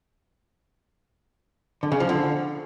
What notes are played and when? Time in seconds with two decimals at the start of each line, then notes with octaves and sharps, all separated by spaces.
1.83 D3
1.92 C#3
2.00 F3
2.09 D3